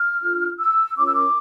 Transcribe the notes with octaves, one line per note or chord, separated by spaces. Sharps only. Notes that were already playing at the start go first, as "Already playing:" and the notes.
Already playing: F6
D4 F4 A4
E6
C#4 F4 A#4 C#5 D6
E6
D6